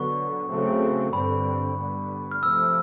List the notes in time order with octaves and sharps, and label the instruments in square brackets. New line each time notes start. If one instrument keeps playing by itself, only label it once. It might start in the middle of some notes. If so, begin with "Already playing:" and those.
Already playing: [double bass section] D3 F#3 B3 [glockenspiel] C#6
[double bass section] C#3 F#3 A3 C4
[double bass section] G2 D3 G3 C4 [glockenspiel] B5
[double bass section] D3 G3 B3
[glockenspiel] F6
[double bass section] C3 F3 A3 C4 [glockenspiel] E6